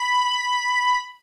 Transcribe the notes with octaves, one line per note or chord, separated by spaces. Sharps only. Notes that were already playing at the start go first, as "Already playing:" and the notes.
Already playing: B5